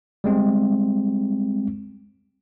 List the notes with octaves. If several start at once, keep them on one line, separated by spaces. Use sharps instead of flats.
G3 G#3 C4